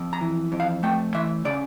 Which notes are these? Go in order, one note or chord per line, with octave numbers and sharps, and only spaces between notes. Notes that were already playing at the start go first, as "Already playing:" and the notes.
Already playing: F2
A#5
E3
F2
F5
A3 G5
E3 E5
C#3 D5